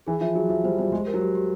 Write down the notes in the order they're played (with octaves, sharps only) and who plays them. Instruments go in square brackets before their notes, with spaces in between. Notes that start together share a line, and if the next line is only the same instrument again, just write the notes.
[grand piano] E3 [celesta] G#4
[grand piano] F3 [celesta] E5
[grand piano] F#3 [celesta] G#4
[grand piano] F3 [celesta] E5
[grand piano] G3 [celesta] C5
[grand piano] G3 [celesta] C5
[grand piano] G#3 [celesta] G4
[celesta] A#4
[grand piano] F#3
[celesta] G4
G4